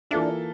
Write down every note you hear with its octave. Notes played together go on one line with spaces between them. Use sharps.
E3 A#3 D4 F4 A4 E5